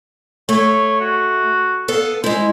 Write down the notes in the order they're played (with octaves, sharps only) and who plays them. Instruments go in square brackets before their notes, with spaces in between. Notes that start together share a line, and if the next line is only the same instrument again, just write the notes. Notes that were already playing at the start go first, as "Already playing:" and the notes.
[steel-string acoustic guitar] A3 [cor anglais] C#5
[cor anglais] F#4
[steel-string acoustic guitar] B3 A4 F5
[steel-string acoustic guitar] G#3 E4 [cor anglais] C5